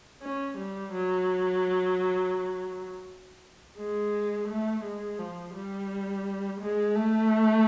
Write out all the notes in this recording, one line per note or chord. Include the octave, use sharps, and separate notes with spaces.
C#4
G3
F#3
G#3
A3
G#3
F3
G3
G#3
A3